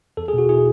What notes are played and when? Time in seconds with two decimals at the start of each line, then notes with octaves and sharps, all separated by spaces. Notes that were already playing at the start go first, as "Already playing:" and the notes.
0.17 E2 A4
0.28 G#4
0.33 B2 F#4
0.49 E4 G#4